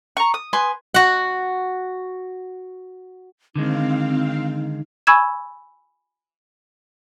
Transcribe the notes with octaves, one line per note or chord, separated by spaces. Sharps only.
A#5 C#6
D#6
B4 G#5 C6
F#4 F#5
D3 D#3 G#3 C4 D#4 F5
G#5 B5 C#6 E6 G#6 E7